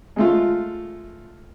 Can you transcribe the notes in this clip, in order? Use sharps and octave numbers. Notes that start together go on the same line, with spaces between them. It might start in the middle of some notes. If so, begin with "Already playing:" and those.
G#3 A3 F4